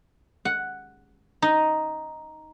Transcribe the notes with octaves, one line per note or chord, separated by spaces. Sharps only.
F#5
D#4